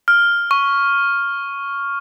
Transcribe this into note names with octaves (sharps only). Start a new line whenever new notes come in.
F6
C#6